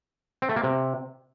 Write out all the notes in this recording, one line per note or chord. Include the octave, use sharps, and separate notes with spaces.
C4
A3
A#3
C3